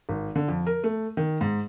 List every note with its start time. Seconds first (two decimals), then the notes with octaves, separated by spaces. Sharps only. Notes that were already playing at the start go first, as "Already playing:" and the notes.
0.09 G#1
0.36 D3
0.48 F2
0.66 A#4
0.84 A3
1.17 D#3
1.41 G#2